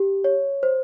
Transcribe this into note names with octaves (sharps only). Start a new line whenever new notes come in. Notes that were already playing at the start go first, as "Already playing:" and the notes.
Already playing: G4
C#5
C5